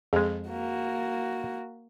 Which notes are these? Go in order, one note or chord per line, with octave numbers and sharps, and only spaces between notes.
F2 G#3 G#4
A#3 F#4